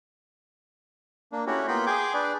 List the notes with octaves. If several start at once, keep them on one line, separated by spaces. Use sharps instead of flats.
A#3 D4
A3 C#4 E4 F#4 G4
A#3 B3 F4 G5 B5 C6
G#4 G5 G#5 C6 D6
D4 G#4 B4 D5